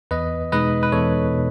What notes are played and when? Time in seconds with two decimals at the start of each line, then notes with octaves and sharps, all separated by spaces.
0.11 E2 B4 D#5
0.52 B2 G#3 D#4 B4 D#5
0.83 B4
0.92 E2 A4 C#5
1.34 B2